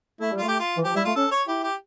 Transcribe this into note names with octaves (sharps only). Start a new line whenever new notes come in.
A3 E4
G3
F4
A3
G4
F4
E3
F3 G4
G3 E4
A3 F4
C#4 A4
C#5
E4 G4
G4